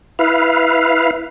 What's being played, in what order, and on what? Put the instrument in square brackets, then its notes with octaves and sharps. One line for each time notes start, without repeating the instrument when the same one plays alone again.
[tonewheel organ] E4 B4 F5